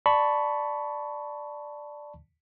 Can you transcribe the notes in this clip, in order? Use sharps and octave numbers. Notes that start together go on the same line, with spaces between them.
D5 A5 B5 C#6